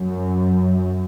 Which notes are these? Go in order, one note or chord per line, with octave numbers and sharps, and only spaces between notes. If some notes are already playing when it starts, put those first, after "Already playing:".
Already playing: F#2